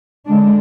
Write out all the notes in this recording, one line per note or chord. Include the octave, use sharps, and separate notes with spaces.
D3 G#3 D4